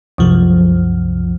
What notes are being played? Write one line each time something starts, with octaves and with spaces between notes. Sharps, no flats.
C2 F#2 F3